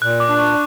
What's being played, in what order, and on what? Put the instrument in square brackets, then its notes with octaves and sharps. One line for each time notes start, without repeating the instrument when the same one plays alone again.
[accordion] A#2 [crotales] F#6
[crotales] D6
[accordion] D4
[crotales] C#6